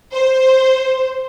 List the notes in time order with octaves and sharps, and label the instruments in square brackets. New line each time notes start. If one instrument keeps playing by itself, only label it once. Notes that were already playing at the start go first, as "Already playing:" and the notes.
[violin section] C5